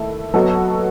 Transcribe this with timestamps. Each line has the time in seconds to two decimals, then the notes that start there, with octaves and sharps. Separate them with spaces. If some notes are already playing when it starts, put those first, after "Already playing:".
Already playing: D#3 A3 E4 A4 E5
0.34 F#3 B3 F#4 A4 D#5